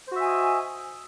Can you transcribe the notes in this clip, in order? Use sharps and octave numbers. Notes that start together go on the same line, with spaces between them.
F#4 C5 D#5 E5 G#5